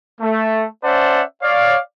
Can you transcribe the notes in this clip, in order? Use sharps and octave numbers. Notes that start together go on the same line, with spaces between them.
A3
C#4 C5 D5 E5 F#5 A5
C#5 D5 F5